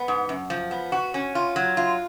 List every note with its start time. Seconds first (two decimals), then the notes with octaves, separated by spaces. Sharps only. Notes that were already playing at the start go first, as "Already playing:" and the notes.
Already playing: B3
0.08 G#2
0.29 F#2
0.50 F3
0.71 B3
0.92 F#4
1.14 C#4
1.35 F4
1.56 F#3
1.77 F4